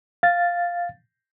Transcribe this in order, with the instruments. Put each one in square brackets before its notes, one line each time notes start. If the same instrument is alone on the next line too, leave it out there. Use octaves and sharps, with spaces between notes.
[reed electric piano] F5 A6